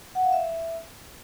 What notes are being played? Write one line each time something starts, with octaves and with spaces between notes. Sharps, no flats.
F#5
F5
E5